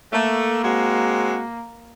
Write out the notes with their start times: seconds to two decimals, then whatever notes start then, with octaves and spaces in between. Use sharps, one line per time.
0.12 A3 A#3
0.63 G#3 C4 F#4